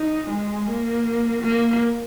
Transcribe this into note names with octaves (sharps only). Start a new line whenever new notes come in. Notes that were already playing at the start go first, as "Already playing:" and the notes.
Already playing: D#4
G#3
A#3
A#3